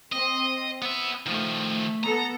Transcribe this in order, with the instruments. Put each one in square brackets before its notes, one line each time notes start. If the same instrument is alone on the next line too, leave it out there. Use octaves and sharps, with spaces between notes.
[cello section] C4 [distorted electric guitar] D#5
[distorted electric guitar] B3 E5
[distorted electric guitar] D#3 F3 [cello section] A3
[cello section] B3 A4 [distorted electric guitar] A#5